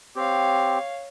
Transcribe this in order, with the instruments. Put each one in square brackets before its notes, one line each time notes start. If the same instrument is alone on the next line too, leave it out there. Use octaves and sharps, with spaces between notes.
[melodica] C4 G4 [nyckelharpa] C#5 F5